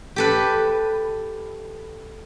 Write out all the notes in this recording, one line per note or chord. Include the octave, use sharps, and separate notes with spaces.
G4 A4 B4